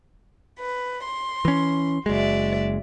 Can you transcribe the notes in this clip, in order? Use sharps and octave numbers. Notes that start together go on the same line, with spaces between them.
B4
C6
E3 C#4
F#1 G#3 F#4 D5 E5